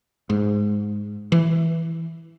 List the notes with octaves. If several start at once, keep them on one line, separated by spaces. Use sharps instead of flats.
G#2
E3